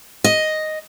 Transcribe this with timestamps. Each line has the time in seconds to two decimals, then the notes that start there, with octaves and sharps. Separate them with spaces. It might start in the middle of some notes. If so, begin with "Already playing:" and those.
0.24 D#5